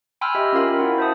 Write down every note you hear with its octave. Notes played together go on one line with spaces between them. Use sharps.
G5 G#5 B5 C6 E6 F6
G4 D#5 E5
C#4 F4 A#4 F5 B5
E4 F#4 F#5
C5 E5 A5 D#6